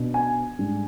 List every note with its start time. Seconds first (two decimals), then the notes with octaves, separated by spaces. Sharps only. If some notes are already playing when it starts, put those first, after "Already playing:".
Already playing: B2 B3 D4
0.14 G#5
0.59 G#2 G3 D4